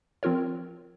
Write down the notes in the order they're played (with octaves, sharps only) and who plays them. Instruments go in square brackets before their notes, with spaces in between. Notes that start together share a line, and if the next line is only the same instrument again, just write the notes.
[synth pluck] F3 C4 F4 A#4 C#5